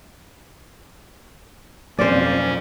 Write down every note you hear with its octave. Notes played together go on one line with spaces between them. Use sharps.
F2 B2 F#3 A#3 C#4 C5 D5